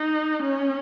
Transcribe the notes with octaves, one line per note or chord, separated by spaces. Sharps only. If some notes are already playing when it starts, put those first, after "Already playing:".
Already playing: D#4
C#4